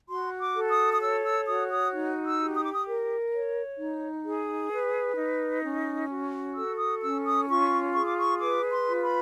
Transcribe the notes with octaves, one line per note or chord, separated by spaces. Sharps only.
F#4 C6
D6
A4
D#6
D#6
C#5 E6
E6
F#4 D#6
D#6
D#4
E6
G4
D#6
D6
D#6
A#4
C#5
D#4
G#4
B4
D#4
C#4
F#4
A4 E6
D#6
C#4 E6
D#6
F4 C#6
G#4 C#6
D6
C#6
B4 D6
C6
F4
B5